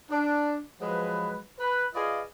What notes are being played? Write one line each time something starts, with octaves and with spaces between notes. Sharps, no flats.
D4
F3 F#3 G#3 B4
B4
F4 G#4 B4 D5 D#5 F5